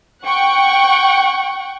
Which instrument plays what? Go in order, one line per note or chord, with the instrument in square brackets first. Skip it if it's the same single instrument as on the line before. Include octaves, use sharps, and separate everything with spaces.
[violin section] F#5 G5 C#6